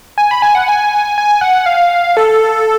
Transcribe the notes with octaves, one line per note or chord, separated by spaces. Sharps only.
G#5
B5
G#5
F#5
G#5
G#5
F#5
F5
A4